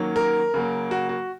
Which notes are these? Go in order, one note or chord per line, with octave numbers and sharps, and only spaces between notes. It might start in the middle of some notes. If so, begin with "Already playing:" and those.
Already playing: D#3 F#3 A#3 C#4
A#4
C#3 F#3 A#3
F#4
F#4